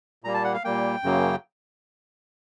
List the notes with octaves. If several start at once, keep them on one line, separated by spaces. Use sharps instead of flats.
A#2 G3 A#3 A#5
A5
F#5
F5
A#2 G3 A#3 G5
F#2 C#3 F#3 A#3